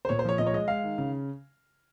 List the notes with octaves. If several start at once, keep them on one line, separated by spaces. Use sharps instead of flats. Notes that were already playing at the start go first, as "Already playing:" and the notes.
C5
A#2 C#5
C5
F3 C#5
A#2 D#5
C#5
G#3 D#5
G#3 F5
D#3
C#3